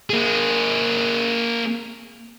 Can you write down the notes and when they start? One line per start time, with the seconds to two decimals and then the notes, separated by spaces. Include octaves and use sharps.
0.10 A#3 G#4